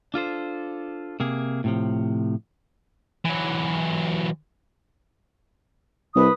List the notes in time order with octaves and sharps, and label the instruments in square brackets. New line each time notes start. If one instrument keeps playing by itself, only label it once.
[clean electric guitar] D4 F4 A4 C5
C3 A#3 G#4
A2 C3 F3
[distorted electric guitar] E3 F#3
[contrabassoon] C2 [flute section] B4 D#6